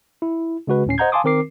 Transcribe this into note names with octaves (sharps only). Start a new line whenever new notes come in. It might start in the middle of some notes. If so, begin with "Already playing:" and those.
E4
C#3 G#3 F#4 B4
D2 A2 C#4 C7
C5 D#5 F#5 A#5 G6 G#6
F5 G#5 A5 C6 D6 D#6
D#3 C4 A#4 D6 C7